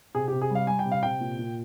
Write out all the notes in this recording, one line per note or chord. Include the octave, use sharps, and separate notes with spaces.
C3 G#4
G4
C3
G#4
G3
F5
G3 G#5
G5
C3
F5
C3 G5
A#2
A#2